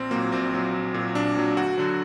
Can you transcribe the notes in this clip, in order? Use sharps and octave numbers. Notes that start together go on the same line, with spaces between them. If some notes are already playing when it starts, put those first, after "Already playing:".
Already playing: A#1 C4
A#2 F#3 A#3
A#1 C4
A#2 F#3
A#1
A#2 F#3
A#1 D4
A#2 F#3
D2 F#4
D3 F#3